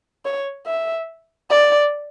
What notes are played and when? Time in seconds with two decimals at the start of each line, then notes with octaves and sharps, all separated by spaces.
0.25 C#5
0.67 E5
1.50 D5